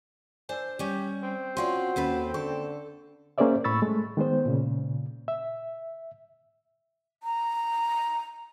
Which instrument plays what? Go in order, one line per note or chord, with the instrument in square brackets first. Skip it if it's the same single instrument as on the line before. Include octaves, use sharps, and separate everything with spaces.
[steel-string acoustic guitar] D4 C5 A5 [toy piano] A#4 D5 G#5
[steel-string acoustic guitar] G3 C#4 [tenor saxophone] G4
[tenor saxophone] C4
[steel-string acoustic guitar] C#4 F4 D5 [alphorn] F#4 [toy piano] E5 C6
[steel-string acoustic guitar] D#2 A4 B4 [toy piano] C#4
[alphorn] D3 [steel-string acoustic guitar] A4 [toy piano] C#6
[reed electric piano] A#3 C#4 G#4 C5 D5 E5
A2 B5 C#6 E6 A6
G#3 A3
D#3 G#3 B3 C5
A#2 C#3
E5
[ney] A#5